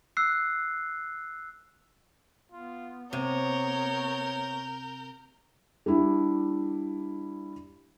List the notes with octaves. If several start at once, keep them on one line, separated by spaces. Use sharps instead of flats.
E6 F#6 C7
B3 F4
C3 A#4 C#5 G6
G3 D4 E4